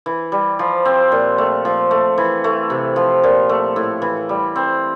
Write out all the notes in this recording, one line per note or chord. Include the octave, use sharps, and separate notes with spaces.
E3
G3
F3
C4
A#2
A3
F3
A3
E3
A3
C3
F3
A#2
A3
A2
E3
G3
C4